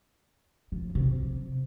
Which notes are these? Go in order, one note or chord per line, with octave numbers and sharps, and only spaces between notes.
F3
C3